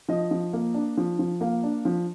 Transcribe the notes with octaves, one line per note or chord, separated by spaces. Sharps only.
F3 D#5
F3
A#3
D4
F3
F3
A#3 F5
D4
F3